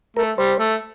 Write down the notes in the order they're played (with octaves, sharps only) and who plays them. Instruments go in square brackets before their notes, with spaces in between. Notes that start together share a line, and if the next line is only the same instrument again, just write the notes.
[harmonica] A3 [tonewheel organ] A#4
[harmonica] G3 [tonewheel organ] C5
[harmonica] A3